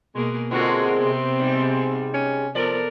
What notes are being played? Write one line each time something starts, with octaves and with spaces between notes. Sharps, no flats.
B2 G#3 A#3 G#4
B2 D3 G#3 C4 F4 F#4 A#4
C3 B3
G#2 G3
C#4
F3 B3 A4 A#4 D5